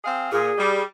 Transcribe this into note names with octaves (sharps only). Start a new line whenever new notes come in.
C4 G#4 F5
A#2 G#4
G3